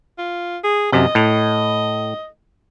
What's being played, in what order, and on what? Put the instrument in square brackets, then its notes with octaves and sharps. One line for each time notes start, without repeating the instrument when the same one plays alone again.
[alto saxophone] F4
G#4
[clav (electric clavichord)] F#2 C3 [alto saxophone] D#5
[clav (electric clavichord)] A2